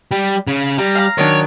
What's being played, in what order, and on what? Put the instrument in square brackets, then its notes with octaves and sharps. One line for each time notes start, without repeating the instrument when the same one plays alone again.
[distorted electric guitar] G3
C#3
[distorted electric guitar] G3 [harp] A#5
[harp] F5 A#5
[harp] D#3 F#3 D4 [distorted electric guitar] C#5